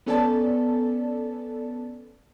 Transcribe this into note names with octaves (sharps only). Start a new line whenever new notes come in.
B3 C#4 A4 D5 G#5 A5